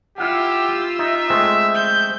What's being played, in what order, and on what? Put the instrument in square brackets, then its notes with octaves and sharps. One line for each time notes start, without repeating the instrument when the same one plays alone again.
[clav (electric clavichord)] E4 F5 F#5 [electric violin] F4 E6 [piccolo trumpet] G4
[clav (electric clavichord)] D#4 [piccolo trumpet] E5
[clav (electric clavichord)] G#3 A3 C4
[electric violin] G6